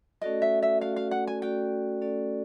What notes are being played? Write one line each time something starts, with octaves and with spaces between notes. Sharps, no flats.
A3 C#4 F#4 A4 D5 D#5
E5
E5
A3 C#4 F#4 A4 D5 F5
F5
F#5
G#5
A3 C#4 F#4 A4 D5 G5
A3 C#4 F#4 A4 D5